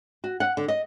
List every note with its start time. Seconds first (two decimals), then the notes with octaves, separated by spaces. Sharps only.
0.24 F#4
0.40 F#5
0.57 D3
0.68 D#5